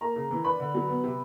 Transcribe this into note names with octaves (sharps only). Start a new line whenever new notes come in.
A#3 A#4 A#5
C#3
E3
D4 B4 B5
D3
F#3
B3
C3